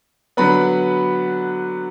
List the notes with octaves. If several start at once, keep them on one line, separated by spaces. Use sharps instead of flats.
D3 F#3 B3 B5